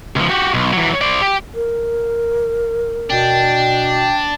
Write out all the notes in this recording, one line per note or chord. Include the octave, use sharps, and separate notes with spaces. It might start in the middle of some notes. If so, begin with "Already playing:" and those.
C#2 F3
F#4 G4
B1
E3 F#3
C5 D5
G4
A#4
B2 D4 G5